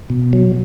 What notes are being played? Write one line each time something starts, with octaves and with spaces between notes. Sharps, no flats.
B2
F#3